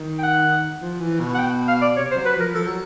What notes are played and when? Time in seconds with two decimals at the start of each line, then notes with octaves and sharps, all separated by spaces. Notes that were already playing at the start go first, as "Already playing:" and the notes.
Already playing: D#3
0.19 G5
0.23 F#5
0.81 F3
1.00 E3
1.20 B2
1.35 F#5
1.39 G5
1.68 F5
1.82 D5
1.97 C3 C#5
2.11 C5
2.16 F#3
2.25 B4
2.36 F3 A#4
2.55 F3 A4
2.67 F#3